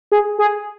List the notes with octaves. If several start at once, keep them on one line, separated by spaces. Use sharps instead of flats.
G#4
G#4